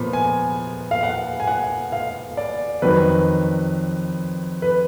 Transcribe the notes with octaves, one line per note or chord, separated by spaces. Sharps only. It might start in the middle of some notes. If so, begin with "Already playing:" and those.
Already playing: A#2 F3 B3 B5
G#5
F5
F#5
G#5
F#5
F5
D5
F2 D#3 F#3 B4
B4